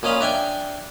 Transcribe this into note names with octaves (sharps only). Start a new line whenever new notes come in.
A#2 C#4 D#5 F5 B5
D4 E5 G5 G#5